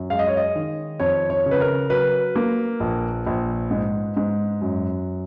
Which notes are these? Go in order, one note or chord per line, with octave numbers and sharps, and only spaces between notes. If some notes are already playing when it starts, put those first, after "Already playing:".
Already playing: F#2
G#3 F5
D#5
C#5
D#5
D#3
F2 C#5
C#5
C#3
B4
A#4
F#3 B4
A#3
A#1
A#1
G#2
G#2
F#2